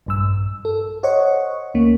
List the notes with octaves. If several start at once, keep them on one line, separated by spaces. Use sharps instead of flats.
A#1 G2 E6
A4
C5 C#5 D#5 F#5 C#6
D2 A#3 C#4